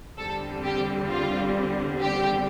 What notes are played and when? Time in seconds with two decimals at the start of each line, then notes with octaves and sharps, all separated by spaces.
0.17 E2 D3 G3 C4 A4
0.64 G4
1.09 F4
2.00 G4